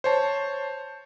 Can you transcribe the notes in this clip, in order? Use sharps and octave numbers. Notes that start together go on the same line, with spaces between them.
C5 C#5 A5